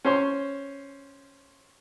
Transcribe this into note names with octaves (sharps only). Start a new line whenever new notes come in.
C#4 C5 C6 C#6